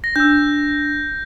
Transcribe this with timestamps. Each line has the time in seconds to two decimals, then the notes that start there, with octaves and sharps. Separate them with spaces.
0.04 A#6
0.16 D4 E6 G6